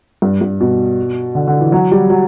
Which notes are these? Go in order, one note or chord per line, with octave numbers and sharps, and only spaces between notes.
G2
G2
B2
D3
D3
E3
F#3
G3
F#3